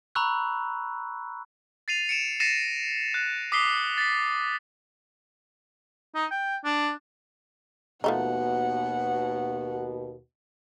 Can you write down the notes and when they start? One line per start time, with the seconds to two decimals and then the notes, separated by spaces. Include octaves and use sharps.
0.15 A#5 B5 C#6 E6 F#6
1.88 A6 C7 D#7 F7
2.09 C#7 D7 E7
2.40 A6 A#6 C7 C#7 D#7 E7
3.14 F#6
3.52 D6 D#6 B6 C7 G7
3.98 A6 B6
6.15 D#4
6.31 G5
6.64 D4
8.04 D#2 B2 F3 A3 D#4 F#5